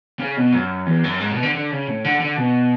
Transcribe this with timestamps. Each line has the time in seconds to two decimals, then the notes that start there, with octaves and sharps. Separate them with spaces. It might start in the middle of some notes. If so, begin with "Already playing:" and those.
0.19 C#3
0.37 B2
0.53 F#2
0.87 E2
1.04 F#2
1.20 G#2
1.31 B2
1.43 D3
1.54 D3
1.71 C#3
1.88 A2
2.04 D3
2.20 D3
2.37 B2